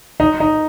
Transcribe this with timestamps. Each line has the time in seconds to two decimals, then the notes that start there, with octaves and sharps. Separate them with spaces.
0.20 D#4
0.40 D#4